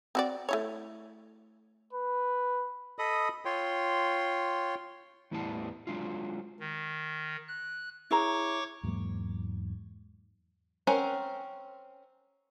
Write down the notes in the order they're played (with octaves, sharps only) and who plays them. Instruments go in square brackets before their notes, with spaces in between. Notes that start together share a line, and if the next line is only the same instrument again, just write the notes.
[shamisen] C4 F#4 D5
A3 E4 C#5
[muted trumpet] B4
[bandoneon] A4 D#5 B5 D#6
F4 C#5 G5 C6
[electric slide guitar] E2 A2 E3 G3 B3 A5
F#3 G#3 D4 F4
[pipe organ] D#3
F#6
[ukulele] E4 G#4 A#5 [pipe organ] C#5 C#6 D6
[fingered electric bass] E2 G#2 F#3 A#3
[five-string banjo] C4 C#4 A#4 C5 F#5